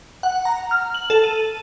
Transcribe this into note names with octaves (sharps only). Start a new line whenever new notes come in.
F#5
A#5
F6
F#7
A4
D#7